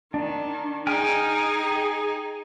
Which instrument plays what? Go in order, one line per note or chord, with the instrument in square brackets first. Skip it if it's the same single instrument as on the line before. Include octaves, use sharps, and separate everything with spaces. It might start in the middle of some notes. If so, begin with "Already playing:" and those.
[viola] D#3 [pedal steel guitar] D4
[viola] D#4 G#4 [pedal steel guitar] G5 G#5 F6